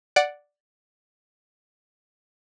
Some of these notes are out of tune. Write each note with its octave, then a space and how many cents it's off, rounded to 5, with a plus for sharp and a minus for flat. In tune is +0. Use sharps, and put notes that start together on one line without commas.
D5 +0 F#5 +0 D6 +0